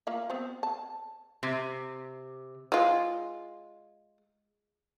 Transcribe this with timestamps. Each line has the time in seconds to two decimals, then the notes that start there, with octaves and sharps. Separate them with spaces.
0.07 A#3 F4 E5
0.30 B3 C4 C5
0.63 A5
1.43 C3
2.72 G#3 F4